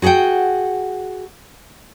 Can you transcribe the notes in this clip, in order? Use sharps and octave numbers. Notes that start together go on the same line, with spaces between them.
F#4 G#4 B4 F#5 G5